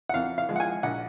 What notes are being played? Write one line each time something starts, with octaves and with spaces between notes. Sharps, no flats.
F#5
F2 F5
F5
F3 G#3
F#5
G#5
A#1 F#5